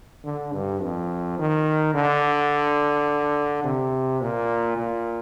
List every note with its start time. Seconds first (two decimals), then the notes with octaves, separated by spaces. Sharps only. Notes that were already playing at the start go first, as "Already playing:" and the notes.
0.25 D3
0.53 G2
0.82 F2
1.39 D#3
1.94 D3
3.64 C3
4.21 A#2
4.78 A#2